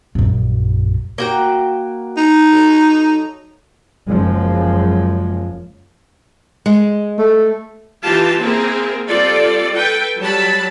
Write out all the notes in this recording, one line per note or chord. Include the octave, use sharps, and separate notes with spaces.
A#1 F#2
A#3 F#4 G5
D#4
F#3 A4
F#1 F#2 F3 G#3
G#3
A3
E3 F4 G4 A5
A#3 C4 E4 G#4 A#4
G3 C4 F4 A4 D5
A4 B4 G5
F#3 G3 A5 B5